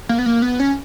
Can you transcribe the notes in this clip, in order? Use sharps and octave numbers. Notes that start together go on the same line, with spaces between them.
A#3
B3
A#3
B3
C#4